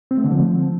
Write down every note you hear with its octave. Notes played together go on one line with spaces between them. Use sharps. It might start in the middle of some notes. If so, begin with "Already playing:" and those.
C4
A3
D3
F3